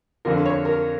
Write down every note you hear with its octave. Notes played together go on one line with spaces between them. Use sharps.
F2 D3 F3 A#4
C#5
A#4